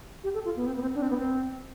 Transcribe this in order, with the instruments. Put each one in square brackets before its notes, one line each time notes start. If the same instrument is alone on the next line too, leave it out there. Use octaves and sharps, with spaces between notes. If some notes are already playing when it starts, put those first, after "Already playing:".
[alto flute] G4
A4
F4
B3
C4
B3
C4
D4
C4
B3
C4